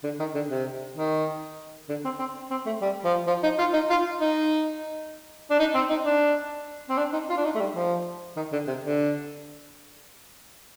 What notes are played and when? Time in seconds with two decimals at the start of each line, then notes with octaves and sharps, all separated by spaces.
0.04 D3
0.20 D#3
0.35 D3
0.50 C3
0.96 D#3
1.89 D3
2.04 C4
2.19 C4
2.51 C4
2.66 A3
2.82 G3
3.05 F3
3.27 F3
3.43 D#4
3.59 F4
3.73 D#4
3.90 F4
4.21 D#4
5.50 D4
5.59 D#4
5.74 C4
5.90 D#4
6.05 D4
6.90 C4
6.98 D4
7.13 D#4
7.29 F4
7.37 D4
7.44 D#4
7.55 A3
7.60 G3
7.75 F3
8.37 D#3
8.52 D3
8.67 C3
8.84 D3